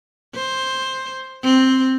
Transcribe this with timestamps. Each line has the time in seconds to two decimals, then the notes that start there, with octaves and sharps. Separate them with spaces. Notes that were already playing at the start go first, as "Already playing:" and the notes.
0.35 C5
1.44 C4